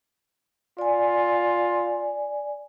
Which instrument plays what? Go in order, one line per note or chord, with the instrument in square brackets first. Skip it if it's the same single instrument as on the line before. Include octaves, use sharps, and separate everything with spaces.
[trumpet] F4 [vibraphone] D5 G#5